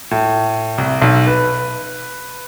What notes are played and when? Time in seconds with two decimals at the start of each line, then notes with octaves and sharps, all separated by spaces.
0.11 A2
0.78 C2
1.02 B1
1.27 B4